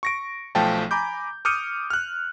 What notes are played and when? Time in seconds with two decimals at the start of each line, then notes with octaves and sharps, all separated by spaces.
0.03 C#6 A#6 D7
0.55 B1 F3 A3 F5 G5 A5
0.91 G#5 A#5 B5 D6 G6
1.45 D6 D#6 F6 G6 C#7 D#7
1.90 F6 F#6